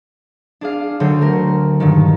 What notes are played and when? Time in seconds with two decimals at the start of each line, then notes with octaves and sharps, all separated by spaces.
0.61 D4 G#4 F5
1.00 D2 D3 F#3 C#5 G6
1.21 A3 A#4
1.80 G2 A#2 D#3